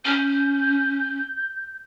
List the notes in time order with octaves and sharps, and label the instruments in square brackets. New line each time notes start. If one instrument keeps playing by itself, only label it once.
[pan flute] C#4 [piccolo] G6